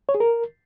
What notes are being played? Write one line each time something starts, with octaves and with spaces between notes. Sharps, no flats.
C#5
G#4
A#4